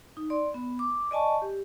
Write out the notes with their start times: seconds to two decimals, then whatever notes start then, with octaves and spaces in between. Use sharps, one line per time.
0.17 D#4
0.30 D5 C6
0.54 B3
0.79 D6
1.11 D5 D#5 G#5 A5 C#6
1.42 G4